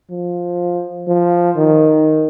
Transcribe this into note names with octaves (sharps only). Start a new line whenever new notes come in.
F3
F3
D#3